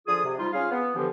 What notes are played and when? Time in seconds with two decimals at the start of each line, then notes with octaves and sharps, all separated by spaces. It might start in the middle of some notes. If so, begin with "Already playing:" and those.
0.07 D3 F3 F4 G#4 D#6
0.25 C3
0.38 F3 G3 D#4 F4
0.53 C#4 F4 G#4 F5
0.71 B3
0.95 G2 D3 E3 F3 G4